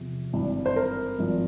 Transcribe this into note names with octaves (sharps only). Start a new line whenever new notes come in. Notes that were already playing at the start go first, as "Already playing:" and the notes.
Already playing: E2 C3 F3
G#1 G2 E3
C5
A#4
G#1 G2 F3